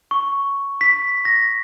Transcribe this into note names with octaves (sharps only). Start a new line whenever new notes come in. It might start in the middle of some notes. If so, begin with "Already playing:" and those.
C#6
B6
A#6